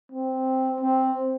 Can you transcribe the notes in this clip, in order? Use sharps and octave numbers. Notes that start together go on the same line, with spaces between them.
C4
C4